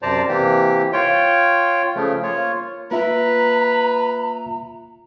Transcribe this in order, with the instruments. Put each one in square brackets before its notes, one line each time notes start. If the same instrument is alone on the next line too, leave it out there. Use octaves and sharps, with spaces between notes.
[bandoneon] F#2 C3 C5 D5 A5 A#5
C3 E3 A#3 G4
F4 C#5 G5
C#3 F3 A3
A#3 F4 C#5
[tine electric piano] A#3 F4 E5 [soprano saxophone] B4 [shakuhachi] A#5